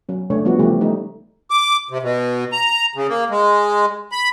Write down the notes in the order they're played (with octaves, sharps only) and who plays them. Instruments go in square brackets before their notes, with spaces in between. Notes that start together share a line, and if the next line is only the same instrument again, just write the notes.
[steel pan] F#3 C#4
C#3 A3 D4 C#5
F3 G3 B3 F#4
C#3 E3 F3 G3 A3 G4
G3 A3 D#4
[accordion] D6
C3
B2
A#5
C#3
A#3
G#3
B5